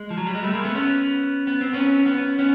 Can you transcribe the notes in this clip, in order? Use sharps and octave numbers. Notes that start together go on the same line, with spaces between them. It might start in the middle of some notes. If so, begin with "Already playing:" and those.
Already playing: G#3
F3
F#3
G3
G#3
G3 A3
G#3 A#3
A3 B3
B3 C#4
B3
C4
B3 C#4
B3 C#4
B3 C#4